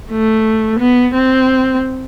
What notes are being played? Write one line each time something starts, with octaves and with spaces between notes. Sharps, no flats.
A3
B3
C4